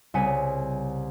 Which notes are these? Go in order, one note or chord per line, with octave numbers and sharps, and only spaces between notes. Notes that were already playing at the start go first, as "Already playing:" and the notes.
C2 C#3 G#5 B6 C#7 D#7